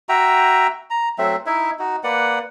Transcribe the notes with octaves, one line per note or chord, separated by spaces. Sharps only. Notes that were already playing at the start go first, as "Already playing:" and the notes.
F#4 E5 G5 A#5
A#5
F#3 A3 C4 E5
D#4 E4 E5
D#4 F#4
A#3 B4 D5 F#5